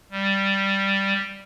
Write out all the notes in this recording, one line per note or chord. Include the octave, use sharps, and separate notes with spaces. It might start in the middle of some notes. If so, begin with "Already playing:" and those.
G3